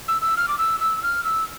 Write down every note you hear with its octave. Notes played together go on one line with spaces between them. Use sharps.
E6
E6
F6
D6
E6
E6
F6
E6